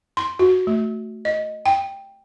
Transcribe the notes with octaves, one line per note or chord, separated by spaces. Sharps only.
C6
F#4
A3
D#5
G5